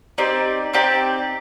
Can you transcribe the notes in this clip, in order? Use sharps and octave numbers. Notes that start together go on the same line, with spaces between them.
C4 D#4 G4 D5
C4 D#4 G4 D5